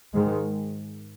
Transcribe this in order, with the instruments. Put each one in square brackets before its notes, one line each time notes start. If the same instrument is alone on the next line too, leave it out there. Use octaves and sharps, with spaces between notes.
[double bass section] G#2 D#3 G#3